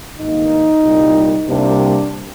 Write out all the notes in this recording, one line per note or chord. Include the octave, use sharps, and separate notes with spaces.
G#1 G2 D#3 A#3 D#4
C2 A#2 G3
C2 C3 G3 A#3 D4